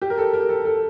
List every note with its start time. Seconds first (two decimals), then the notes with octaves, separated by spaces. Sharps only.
0.02 G4
0.10 A#4
0.18 A4
0.33 A#4
0.49 A4
0.65 A4